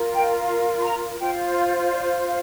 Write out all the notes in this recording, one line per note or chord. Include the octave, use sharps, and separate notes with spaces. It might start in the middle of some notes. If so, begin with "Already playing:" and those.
Already playing: F4 A#4
G5
C6
A#5
F4 C5 G5
F5
D5
F5